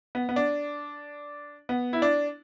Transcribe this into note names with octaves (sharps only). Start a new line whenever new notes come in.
B3
B3
D4
B3
E4
D4